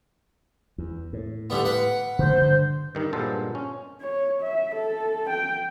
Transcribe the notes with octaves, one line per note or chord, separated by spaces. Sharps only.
E2
A2
D3 G3 B3
B4 F#5
D3 D#3 A3 C5
G2 D3
G2 D#3 D#4
G2 A#2 G#3 B3 A4 C5
C#4
C#5
E5
A4
G5